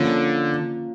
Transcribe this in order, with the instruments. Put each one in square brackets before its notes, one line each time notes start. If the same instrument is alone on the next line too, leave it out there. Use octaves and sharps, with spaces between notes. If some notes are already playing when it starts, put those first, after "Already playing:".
Already playing: [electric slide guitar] D3 [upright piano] F3 A#3 C#4